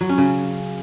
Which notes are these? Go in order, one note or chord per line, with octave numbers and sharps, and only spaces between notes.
F#3
C#4
C#3